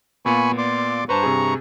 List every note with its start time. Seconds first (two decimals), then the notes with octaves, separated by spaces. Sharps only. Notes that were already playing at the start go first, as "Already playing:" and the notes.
0.26 A#2 B3 F4 G#5 B5 C#6
0.58 D5 C6 D6
1.09 G2 B4 C5 A5 A#5 C#6
1.23 C3 G#4